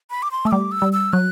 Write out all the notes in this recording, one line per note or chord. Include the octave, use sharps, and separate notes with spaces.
B5
D6
C6
A3 E6
G3 D6
E6
G3
E6
F#3 F#6